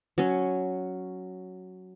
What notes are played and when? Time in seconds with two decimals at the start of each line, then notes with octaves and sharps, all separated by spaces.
0.18 F#3 C#4